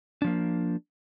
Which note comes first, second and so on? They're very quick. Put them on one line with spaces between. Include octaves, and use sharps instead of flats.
D4 F3 A#3